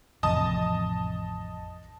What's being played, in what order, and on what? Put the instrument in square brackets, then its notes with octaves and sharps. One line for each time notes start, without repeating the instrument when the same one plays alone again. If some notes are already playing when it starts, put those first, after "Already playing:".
[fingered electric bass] A1 F2 C3 [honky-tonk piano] D#5 A5 D#6